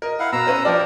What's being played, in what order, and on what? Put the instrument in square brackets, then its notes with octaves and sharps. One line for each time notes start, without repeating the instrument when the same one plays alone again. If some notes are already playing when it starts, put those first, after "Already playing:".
[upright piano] A#4 D#5
[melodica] E4 F5 F#5
[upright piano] B2 [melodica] A#5 E6
[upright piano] C#4 B4 C5
[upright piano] F3 D5 [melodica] D4 G4 A#4